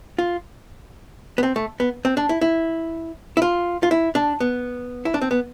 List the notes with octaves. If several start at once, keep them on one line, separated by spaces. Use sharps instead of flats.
F4
B3
C4
A3
B3
C4
D4
E4
E4
E4
F4
F4
E4
D4
B3
E4
D4
C4
B3